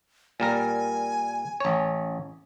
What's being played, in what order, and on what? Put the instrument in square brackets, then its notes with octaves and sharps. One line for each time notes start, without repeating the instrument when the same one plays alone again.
[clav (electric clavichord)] A#2 G3 A#4 [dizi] G#5
[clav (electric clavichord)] A1 C#5